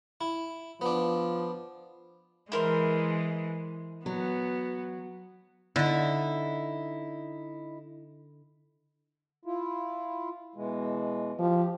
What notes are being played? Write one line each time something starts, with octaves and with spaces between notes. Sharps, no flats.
E4
F3 B3 D4
E3 G#3 E4 A#4 C5
F#3 B3
D3 D#4 E4
E4 F4
B2 E3 G#3
F3 G4